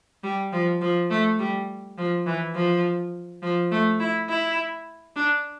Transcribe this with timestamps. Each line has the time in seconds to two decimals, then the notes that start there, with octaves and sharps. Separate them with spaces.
0.23 G3
0.53 F3
0.82 F3
1.10 A3
1.40 G3
1.98 F3
2.27 E3
2.55 F3
3.43 F3
3.72 A3
4.00 E4
4.30 E4
5.16 D4